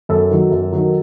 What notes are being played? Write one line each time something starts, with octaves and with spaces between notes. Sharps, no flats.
F#2 A4
D#3 F#3
F#2
D#3 F#3